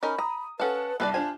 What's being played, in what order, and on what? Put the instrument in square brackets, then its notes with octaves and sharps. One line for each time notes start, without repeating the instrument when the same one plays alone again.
[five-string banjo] C#4 D#4 A#4 [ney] B5
[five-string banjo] A#5 [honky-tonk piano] D#6
[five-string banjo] C#4 F5 [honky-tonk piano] A4 F#5 A5 [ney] B4
[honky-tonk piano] C2 G2 [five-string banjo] B3 B4 D5 [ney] A5
[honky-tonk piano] D4 F4 C5 [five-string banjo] G#5